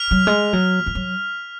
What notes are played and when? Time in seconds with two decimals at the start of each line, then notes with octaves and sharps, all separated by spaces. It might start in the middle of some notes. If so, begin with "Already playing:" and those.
Already playing: F6 B6 F7
0.11 F#3
0.27 G#3
0.53 F#3
0.86 F3
0.95 F#3